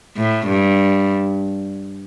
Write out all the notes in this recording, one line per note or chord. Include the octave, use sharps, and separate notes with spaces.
A2
G2